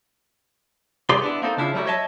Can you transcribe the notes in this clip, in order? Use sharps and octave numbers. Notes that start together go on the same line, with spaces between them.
C2 G4 G#4 D5 C6
B3 D4 E4
A#3 C4 D#4 A4
C#3 D4 E4 F4
F#3 G3 A3 D#4 E4 F#4
C#5 D#5 E5 A5